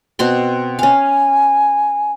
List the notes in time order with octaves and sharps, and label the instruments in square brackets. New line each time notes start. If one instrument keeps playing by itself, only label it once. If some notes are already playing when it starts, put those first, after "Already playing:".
[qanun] B2 C4 C6
[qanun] C#4 F5 [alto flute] G#5